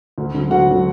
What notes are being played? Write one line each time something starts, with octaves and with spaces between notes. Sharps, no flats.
D2
D3 F#3
D2 F#4 F#5
D3 F#3